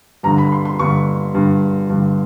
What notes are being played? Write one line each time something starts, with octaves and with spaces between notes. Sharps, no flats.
G2 D3 A#5
B5
C6
C6
G2 D3 C#6
G2 D3
G2 D3